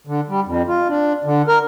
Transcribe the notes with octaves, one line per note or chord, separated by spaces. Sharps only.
D3
G3
F2
F4
D4
D3
A#4